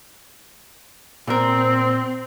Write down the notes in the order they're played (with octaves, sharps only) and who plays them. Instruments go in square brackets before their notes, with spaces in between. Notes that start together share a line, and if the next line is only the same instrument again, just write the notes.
[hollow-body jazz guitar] A#2 A#4 [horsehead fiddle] C4